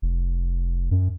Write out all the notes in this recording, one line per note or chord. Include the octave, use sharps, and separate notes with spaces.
F1
F#2